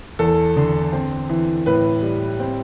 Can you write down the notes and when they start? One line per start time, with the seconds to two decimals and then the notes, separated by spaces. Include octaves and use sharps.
0.19 E2 A4
0.57 D3
0.93 C4
1.29 E3
1.66 A2 B4
2.02 G3
2.40 C4